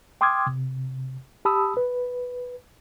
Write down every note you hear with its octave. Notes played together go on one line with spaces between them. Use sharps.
G5 C6 D6 D#6 F6 G#6
C3
G4 A5 B5 D#6 E6
B4